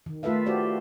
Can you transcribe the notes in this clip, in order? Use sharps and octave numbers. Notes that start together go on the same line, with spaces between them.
D#3
A3 F4 A4 B4 E5 F5
F#4 G4 C5 D5